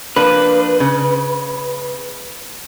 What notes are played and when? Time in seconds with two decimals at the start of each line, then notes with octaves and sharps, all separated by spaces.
0.16 F3 A#3 D4 B4
0.80 C#3